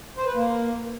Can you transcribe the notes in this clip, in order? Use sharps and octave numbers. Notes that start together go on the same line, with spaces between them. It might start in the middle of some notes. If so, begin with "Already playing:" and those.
C5
B4
A#3